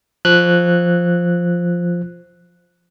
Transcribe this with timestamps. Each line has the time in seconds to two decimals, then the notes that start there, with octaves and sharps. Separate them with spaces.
0.25 F3 F#6